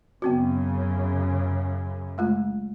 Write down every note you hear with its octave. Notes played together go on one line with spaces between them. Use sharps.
F#2 C#3 B3 C4 F#4
G#3 A3 F4